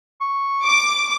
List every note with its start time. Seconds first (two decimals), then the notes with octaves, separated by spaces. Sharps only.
0.21 C#6
0.63 D6